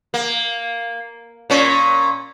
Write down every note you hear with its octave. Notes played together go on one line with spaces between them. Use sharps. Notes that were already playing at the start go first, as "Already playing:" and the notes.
A#3
A#2 C#4